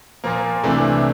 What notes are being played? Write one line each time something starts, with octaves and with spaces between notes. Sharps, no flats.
A#2 F3 A#3
C2 C3 E3 A3 D4